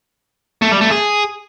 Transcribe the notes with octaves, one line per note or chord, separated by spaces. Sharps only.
A3
G3
A3
G#4